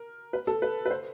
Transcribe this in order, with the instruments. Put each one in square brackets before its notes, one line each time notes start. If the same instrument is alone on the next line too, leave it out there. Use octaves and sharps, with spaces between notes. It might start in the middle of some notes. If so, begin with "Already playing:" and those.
Already playing: [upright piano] A#4
B4
A4
B4
B4
C5